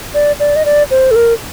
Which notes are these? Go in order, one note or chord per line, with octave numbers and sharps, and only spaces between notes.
D5
D5
D#5
D5
C5
A4
A#4